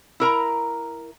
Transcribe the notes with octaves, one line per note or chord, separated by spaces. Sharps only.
E4 A#4 A#5